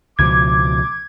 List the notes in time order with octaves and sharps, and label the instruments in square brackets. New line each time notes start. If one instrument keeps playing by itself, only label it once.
[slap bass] C#2 B2 F3 [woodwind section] D6 [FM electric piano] G#6